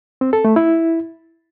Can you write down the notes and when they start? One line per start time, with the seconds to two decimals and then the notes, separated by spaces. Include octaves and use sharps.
0.21 C4
0.33 A4
0.45 A3
0.56 E4